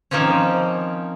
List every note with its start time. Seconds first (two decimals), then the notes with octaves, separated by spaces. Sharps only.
0.11 D#3 F3 A#3 C4 C#4